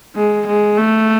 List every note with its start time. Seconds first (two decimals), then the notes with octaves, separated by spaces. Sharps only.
0.16 G#3
0.46 G#3
0.77 A3